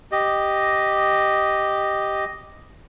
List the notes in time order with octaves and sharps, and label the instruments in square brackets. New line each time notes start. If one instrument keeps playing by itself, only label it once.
[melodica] G4 D#5